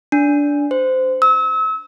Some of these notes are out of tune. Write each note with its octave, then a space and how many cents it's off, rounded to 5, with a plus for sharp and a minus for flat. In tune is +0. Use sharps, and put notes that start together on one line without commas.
D4 -15
C5 -20
E6 -35